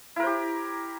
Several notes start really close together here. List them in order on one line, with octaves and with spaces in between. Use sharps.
E4 A#4 C5 G4